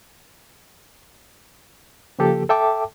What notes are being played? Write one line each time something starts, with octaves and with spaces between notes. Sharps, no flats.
C#3 F3 A#3 G4 A4
A4 E5 G5 A5 D6